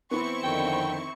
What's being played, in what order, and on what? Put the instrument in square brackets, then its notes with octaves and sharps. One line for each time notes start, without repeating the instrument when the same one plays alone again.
[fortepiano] E3 B3 [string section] C4 E4 C#6
[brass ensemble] F2 D3 D#3 [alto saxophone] G5